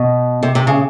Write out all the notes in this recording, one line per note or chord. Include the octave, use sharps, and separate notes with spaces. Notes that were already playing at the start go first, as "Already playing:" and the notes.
Already playing: B2
C3
C3
C#3